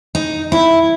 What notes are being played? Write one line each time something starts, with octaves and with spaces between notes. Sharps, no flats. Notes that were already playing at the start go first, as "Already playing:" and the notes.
D#4
E4